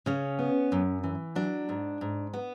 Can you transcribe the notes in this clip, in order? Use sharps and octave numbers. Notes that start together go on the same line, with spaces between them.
C#3 C#4
B3
F#2
E3
F#3 D4
G#2
G#2
B3